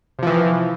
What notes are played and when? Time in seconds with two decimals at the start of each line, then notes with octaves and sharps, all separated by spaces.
0.19 C3
0.23 F3
0.27 E3